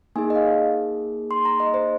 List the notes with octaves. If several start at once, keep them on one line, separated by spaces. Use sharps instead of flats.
A#3 D#4 G#4 G#5
D#5
F5
C6
A#5
D#5
C5